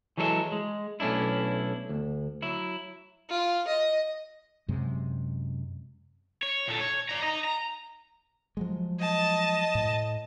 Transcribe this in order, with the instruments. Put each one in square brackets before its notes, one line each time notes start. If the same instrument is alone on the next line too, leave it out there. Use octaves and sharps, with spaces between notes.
[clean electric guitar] E3 F#3 G#3 A4 C#5 E5
G#3
B1 A3 C#4 D4 E4
D2
F#3 E4
[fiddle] F4
D#5
[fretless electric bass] F#2 C3 G#3
[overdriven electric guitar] C#5
A#2 A4
C#5
D5 A#5
D#5 A#5
A#5
[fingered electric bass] F3 F#3 G#3
[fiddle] D#5 A5
[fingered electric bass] A2